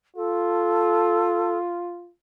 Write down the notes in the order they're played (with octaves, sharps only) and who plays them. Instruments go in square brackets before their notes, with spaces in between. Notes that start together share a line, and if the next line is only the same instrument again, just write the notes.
[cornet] F4 [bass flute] A4